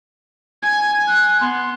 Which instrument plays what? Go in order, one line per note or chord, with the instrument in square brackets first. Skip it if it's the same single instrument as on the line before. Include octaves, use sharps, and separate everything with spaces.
[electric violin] G#5 [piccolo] G#6
[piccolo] F#6
[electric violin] B3 [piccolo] C6